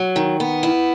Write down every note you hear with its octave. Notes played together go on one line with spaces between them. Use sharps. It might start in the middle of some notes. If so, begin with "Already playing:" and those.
Already playing: F#3
D#3
B3
E4